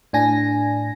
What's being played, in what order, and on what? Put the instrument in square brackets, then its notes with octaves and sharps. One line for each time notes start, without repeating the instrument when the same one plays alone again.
[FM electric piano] A2 D4 G#5 A#6